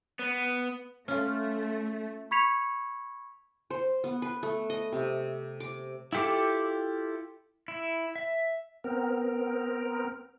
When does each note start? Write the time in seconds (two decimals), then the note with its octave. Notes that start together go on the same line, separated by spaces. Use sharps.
0.19 B3
1.08 A3 C#4 F4
2.31 B5 C#6 G#6 B6 C#7 F7
3.70 C5
4.04 B3
4.22 B4
4.43 A3
4.70 D#5
4.92 C3
5.60 D6
6.13 E4 F4 G4 A4 D6
7.68 E4
8.16 E5
8.84 B3 C4 A#4